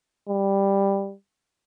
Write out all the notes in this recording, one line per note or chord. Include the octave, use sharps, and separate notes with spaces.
G3